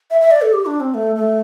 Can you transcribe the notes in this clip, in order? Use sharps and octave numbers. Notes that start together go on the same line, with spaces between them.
E5
E5
D5
A4
G4
D4
C4
A3
A3